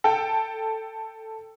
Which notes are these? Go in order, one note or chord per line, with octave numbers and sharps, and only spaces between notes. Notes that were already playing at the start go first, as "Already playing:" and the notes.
A4 G5